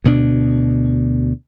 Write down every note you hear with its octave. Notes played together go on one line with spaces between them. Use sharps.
D2 B2 G3 D4